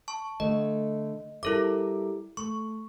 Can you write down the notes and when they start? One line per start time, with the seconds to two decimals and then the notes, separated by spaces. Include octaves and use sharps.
0.08 A5 C#6
0.40 D3 A3 D#5
1.43 G3 E4 A4 A#4 E5 D6
2.37 A3 C#6